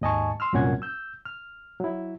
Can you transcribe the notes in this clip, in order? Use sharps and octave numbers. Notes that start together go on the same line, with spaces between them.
D#2 G#2 D#5 G#5 A5 C#6
C6 E6 F6
C2 F#2 A#2 C#4 F#5 G#6
E6 G6
F6
F#3 E4